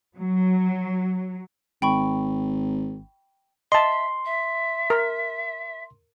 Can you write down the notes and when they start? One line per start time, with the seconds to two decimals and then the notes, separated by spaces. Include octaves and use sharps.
0.17 F#3
1.82 G#1 G5 B5 C#6
3.72 D#5 E5 A5 C6
4.25 E5
4.90 A#4